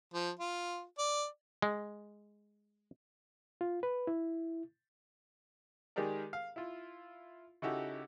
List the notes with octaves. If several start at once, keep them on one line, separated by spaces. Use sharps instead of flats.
F3
F4
D5
G#3
F4
B4
E4
D#3 G#3 G4 G#4 A#4 D5
F5
E4 F4
C#3 D#4 E4 F#4 G4 A4